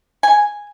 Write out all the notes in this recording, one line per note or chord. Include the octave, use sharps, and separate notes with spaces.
G#5